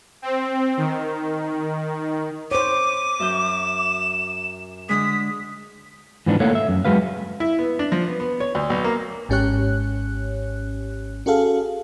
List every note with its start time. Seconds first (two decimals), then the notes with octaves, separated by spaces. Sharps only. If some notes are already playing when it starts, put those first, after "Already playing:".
0.22 C4
0.77 D#3
2.51 C5 C#5 D6 D#7
3.20 F#2 E5 G6 E7
4.89 D3 G#3 D#6 B6
6.26 G#2 E3 F3 B3 D4
6.40 A3 A#3 A4 C#5 F5 F#5
6.55 E5
6.69 F#2
6.85 F#3 G#3 F#4 B4 F5
7.40 E4
7.59 B3
7.79 D4
7.92 F3
8.06 B3
8.20 B3
8.40 C#5
8.55 D2
8.70 B1
8.84 A#3
9.29 G#1 G#2 C#4 G4 C#5 F#6
11.26 C#4 F#4 G#4 A4 F5